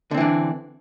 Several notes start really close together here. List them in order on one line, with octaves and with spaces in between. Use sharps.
D3 C4 E3 D4